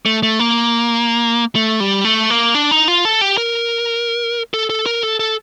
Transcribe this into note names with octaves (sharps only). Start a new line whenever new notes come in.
A3
A3
A#3
A3
G3
A3
A#3
D4
D#4
F4
A4
G4
A#4
A4
A4
A#4
A4
A4